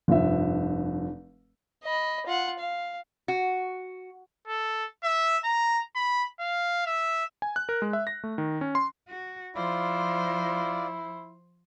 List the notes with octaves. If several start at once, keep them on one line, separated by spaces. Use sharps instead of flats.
F1 G2 F3 E5
D#5 B5
F4 F#5
F5
F#4
A4
E5
A#5
B5
F5
E5
G#5
F#6
A#4
G#3
E5
A#6
A3
D#3
C#4
C6
F#4
F3 E4 F4 C5 D5